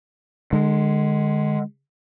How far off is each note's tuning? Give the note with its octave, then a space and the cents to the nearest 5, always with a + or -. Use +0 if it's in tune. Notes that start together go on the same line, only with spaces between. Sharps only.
D3 +40 G#3 +0